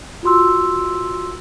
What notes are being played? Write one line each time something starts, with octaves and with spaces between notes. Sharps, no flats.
F4 F#4 C6 E6